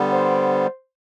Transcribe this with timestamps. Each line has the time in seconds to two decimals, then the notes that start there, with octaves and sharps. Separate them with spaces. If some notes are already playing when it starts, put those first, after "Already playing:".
Already playing: D3 G3 B3
0.12 C5